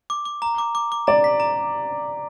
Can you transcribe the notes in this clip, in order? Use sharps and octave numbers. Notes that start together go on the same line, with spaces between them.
D6
D6
A#5
D6
D6
D6
D5 A#5
B6
A#5